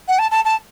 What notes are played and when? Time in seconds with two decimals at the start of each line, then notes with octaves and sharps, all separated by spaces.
0.08 F#5
0.19 A5
0.31 A5
0.45 A5